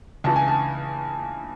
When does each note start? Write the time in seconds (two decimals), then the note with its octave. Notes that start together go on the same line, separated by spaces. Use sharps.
0.24 C#2 C#3 E3 A5
0.36 G#5
0.48 A5